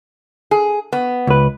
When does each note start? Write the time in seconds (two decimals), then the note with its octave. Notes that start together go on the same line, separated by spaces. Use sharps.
0.51 G#4
0.93 B3
1.27 C#2 B4